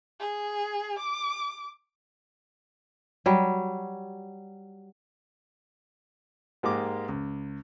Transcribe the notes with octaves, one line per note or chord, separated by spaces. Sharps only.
G#4
D6
F#3 G3
G#2 G#3 A#3 G4 D6
C#2